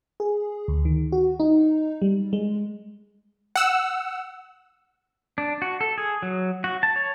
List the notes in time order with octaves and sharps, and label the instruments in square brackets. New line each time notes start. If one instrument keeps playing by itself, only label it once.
[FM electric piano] G#4
D2
D#3
F#4
D#4
G3
G#3
[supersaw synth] F#5 E6
[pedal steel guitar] D4
F#4
A4
G#4
F#3
F#4
A5
C#5